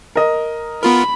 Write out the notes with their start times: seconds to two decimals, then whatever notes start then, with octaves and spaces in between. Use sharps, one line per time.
0.16 A#4 D#5
0.83 B3 F4 A#4 B5